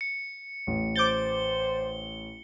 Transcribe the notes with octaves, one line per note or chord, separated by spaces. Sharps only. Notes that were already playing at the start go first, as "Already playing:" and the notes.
C#7
A1
C5 D6 G6 A6 G7